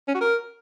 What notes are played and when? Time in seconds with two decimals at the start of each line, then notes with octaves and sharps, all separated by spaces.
0.08 C#4
0.15 F#4
0.21 A#4